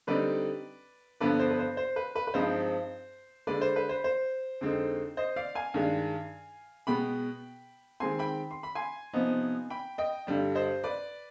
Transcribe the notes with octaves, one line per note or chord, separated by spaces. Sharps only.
D3 G3 C4 D#4 B4 D5
G2 D3 F3 B3 D4 B4 D5
C5
B4
C5
C5
B4
B4
B4
G2 F3 G#3 C4 D#4 C5
D3 G#3 D4 B4 D5
C5
B4
C5
C5
F2 D3 G#3 C4 D#4
C5 D#5
D5 F5
F5 G#5
G2 D#3 G#3 D4
B2 G#3 B3 G5 B5
D#3 G#3 C4 G#5 C6
G5 B5
C6
B5
G#5 C6
C3 F3 B3 D#4
G5 B5
D#5 G5
G2 D3 G3 D4
C5 D#5
B4 D5